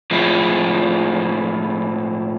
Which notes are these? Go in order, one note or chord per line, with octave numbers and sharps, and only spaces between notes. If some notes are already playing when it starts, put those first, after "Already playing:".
A2 F3 G#3 C4 E4